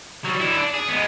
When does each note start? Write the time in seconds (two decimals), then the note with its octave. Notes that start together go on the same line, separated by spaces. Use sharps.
0.24 F#3 G3
0.40 D3 E4
0.57 D4
0.74 G#4
0.88 G#3 B3